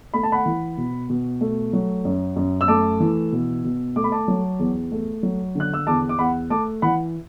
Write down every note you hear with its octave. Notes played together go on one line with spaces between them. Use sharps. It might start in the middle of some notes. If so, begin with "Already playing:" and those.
A3 B5
A5
F#5 B5
E3
B2
B2
A3
F#3
F#2
F#2
E6
A3 A5 D6
E3
B2
B2
A3 D6
B5
A5 D6
F#3
E2
A3
F#3
D3 F#6
E6
E2 A5 D6
D6
E2 F#5 B5
A3 A5 D6
E3 F#5 B5